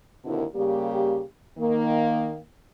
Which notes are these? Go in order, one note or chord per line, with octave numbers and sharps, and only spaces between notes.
D#2 B2 D3 C4 E4 A#4
C#3 G3 A#3 G4
D#3 A#3